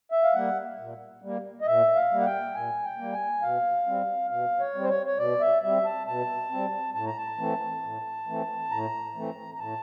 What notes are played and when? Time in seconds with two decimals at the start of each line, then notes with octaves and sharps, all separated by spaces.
0.12 E5
0.24 F5
0.34 G3 A#3 F#5
0.78 A#2
1.22 G3 A#3
1.61 D#5
1.67 A#2 E5
1.96 F5
2.11 G3 A#3
2.20 F#5
2.25 G5
2.54 A#2 G#5
2.84 G5
2.98 G3 A#3
3.13 G#5
3.42 B2 F5
3.87 G3 C4
4.30 B2 F5
4.60 C#5
4.75 G3 C4
4.83 C5
4.90 C#5
5.07 C#5
5.18 B2 D5
5.41 E5
5.63 G3 C4 E5
5.85 A5
6.07 B2 A5
6.51 G3 C4
6.94 A2 A5
7.06 A#5
7.17 A5
7.38 E3 A3 C4
7.83 A2
8.27 E3 A3 C4
8.71 A2 A#5
9.15 E3 A3 C4
9.55 A#5
9.59 A2 A5